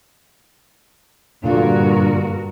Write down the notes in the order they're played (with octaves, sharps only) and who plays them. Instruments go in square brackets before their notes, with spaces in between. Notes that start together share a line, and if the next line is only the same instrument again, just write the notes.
[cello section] G2 F#4 A#4 [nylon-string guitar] A#2 D3 F4